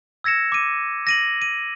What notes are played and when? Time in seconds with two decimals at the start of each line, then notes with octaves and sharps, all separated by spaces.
0.24 E6 G#6 A#6 C#7 E7
0.52 D6 D#7
1.07 A#6 D#7 F#7
1.42 D#7